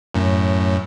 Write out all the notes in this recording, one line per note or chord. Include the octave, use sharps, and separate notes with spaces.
F#2 A2